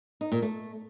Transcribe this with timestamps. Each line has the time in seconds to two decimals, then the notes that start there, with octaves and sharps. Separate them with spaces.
0.21 D#4
0.32 A#2
0.42 A3